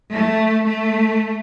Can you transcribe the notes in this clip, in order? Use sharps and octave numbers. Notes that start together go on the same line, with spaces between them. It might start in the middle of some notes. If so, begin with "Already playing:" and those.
A3
A3